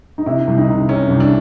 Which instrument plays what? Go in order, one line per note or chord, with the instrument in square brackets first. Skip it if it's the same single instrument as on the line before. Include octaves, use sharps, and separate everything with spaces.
[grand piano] D#4
C3 E4
C2
D#4
C3
C3 C#4
C2
D4